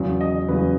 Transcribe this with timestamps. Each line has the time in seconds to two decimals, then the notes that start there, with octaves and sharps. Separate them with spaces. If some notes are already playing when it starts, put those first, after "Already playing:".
Already playing: E2 C#3 F#3
0.21 D#5
0.48 E2 C#3 F#3 B4